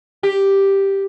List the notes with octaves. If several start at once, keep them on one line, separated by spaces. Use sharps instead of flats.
G4